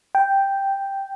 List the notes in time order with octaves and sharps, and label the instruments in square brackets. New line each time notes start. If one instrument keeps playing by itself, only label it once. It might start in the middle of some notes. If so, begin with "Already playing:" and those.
[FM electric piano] G5